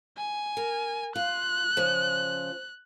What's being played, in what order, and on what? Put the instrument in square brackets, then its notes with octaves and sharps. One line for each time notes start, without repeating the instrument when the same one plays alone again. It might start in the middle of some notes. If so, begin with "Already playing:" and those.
[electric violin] G#5
[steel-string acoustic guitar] A#4
[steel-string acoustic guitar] F4 [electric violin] F#6
[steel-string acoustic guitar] C#3 F3